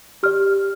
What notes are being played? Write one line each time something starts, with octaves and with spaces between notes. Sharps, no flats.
G4 D5 F6